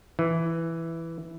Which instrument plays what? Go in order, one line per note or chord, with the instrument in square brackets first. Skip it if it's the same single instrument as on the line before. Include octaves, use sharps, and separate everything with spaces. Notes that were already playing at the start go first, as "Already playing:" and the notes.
[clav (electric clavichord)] E3